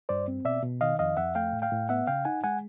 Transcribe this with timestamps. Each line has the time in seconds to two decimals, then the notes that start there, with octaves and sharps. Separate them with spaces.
0.09 G2 C5 D5
0.28 C4
0.45 B2 D5 E5
0.63 B2
0.81 D#3 D#5 F5
0.99 F2 D#5 F5
1.17 F2 E5 F#5
1.35 A3 F5 G5
1.53 A2
1.62 F5 G5
1.72 A2
1.89 B3 E5 F#5
2.07 C#3 F5 G5
2.25 D#4 F#5 G#5
2.44 G#3 F#5 G#5